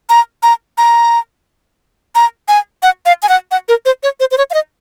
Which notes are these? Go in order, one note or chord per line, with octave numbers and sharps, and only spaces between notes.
A#5
A#5
A#5
A#5
G#5
F#5
F5
G#5
F#5
F#5
A#4
C5
C#5
C5
C5
C#5
F5
D#5